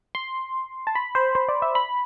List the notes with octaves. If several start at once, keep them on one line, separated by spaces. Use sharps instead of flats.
C6
A5
B5
C5
C5
D5
E5
B5